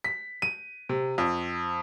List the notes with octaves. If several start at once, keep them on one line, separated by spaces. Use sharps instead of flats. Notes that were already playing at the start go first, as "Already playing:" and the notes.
B6
D#7
C3
F2